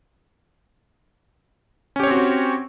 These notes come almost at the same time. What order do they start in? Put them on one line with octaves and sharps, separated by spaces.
C#4 G4 C#5 C4 F#4